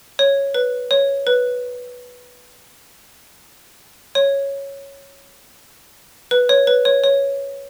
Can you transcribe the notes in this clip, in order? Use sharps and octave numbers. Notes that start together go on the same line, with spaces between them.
C#5
B4
C#5
B4
C#5
B4
C#5
B4
C#5
C#5